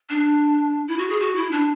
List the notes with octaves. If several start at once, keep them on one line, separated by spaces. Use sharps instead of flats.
D4
E4
F#4
G#4
F#4
E4
D4